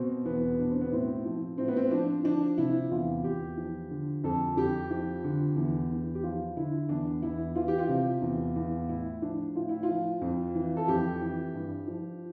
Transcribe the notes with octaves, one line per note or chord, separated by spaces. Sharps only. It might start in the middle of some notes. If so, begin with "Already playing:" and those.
Already playing: B2 C4
E2 B3
B2 D4
C4
B3
A2 C4
F3
A2 C4
B3
C4
F3 D4
F3 D4
C3 E4
E2 F4
E2 G4
F3
D3
F2 A4
F2 G4
F3
D3
E2
E2
G4
F3 F4
D3 E4
E2 D4
E2 E4
E3 F4
G4
F4
C3
E2
E2
A2 E4
F3 D4
A2 F4
E4
F4
F3
F2
E3
A4
F2 G4
E3
G2
F3